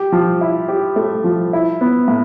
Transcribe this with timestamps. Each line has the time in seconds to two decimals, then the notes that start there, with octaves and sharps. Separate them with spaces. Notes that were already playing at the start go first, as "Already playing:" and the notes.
Already playing: G4
0.12 F3
0.41 E4
0.69 G4
0.96 A3
1.24 F3
1.53 E4
1.81 B3
2.08 A2